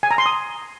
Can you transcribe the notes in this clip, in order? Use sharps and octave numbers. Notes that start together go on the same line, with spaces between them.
G#5
A#5
C6
D#6